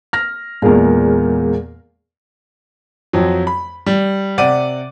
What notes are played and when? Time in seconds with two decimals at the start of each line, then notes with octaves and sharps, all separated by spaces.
0.13 F6 A#6
0.62 E2 A#2 G#3 G#4 A#4
3.13 F2 F3 F#3
3.47 B5
3.86 G3
4.38 C3 D5 F#5 D6 D#7